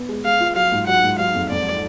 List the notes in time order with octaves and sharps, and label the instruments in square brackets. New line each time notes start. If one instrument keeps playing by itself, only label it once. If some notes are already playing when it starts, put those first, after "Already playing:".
Already playing: [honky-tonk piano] B3
G#3
[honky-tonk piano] G#3 [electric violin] F5
[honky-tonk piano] F4
[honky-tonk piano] F#3 [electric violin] F5
[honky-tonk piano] G#2
[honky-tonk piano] F#3 [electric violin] F#5
[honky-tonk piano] G#2
[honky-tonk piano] F#3 [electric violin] F5
[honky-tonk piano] F2
[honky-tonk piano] F2 [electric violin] D5